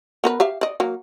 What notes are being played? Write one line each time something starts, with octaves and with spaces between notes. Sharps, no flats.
B3 A#4 B4
G4 E5 F5
D5 D#5
F#3 A#3